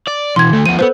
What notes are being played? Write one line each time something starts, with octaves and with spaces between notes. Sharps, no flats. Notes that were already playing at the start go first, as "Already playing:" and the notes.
D5
B2 E3 C6 G#6
D2 A3
F3 B3 D#7
B3 F4 A4 B4 C5